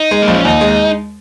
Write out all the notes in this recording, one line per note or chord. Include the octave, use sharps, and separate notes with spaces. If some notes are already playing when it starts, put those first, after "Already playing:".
Already playing: D#4
G#3
A#3
A#1
C#4
D#2 D#4
G#3